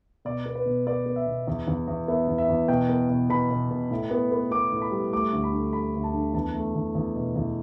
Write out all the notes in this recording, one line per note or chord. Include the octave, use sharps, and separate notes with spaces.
B2 D5
B3
B4
B2
B3 D5
B3
E5
B2
E2
E2
E2
B3 E5
E2
E5
E2
B2 G5
B3
B2
B2 B5
B2
B2
A2
B3
B3
B3 D6
A2
B5
G3
A3 D6
D2
B5
D3
A3 B5
D2
A5
D3
E2 A5
A3
E2
E2
B2
E2